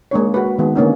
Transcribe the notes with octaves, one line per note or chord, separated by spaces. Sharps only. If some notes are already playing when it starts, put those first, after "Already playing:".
G#3 A#3 D4 C#5
F#4 B4
D#3 G#3 B3
D3 A#3 C#4 D#4